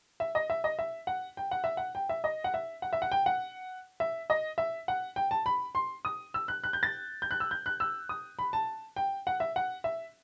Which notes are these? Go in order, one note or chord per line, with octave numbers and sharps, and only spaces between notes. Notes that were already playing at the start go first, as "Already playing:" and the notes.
E5
D#5
E5
D#5
E5
F#5
G5
F#5
E5
F#5
G5
E5
D#5
F#5
E5
F#5
E5
F#5
G5
F#5
E5
D#5
E5
F#5
G5
A5
B5
C6
D#6
E6
F#6
F#6
G6
A6
G6
F#6
E6
G6
F#6
E6
D#6
B5
A5
G5
F#5
E5
F#5
E5